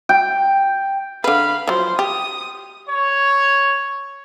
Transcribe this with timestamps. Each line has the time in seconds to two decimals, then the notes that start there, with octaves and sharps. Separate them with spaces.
0.09 G5
1.24 D3 B4 F5 B5
1.68 F3 F#3 C5
1.99 G4 D#6
2.89 C#5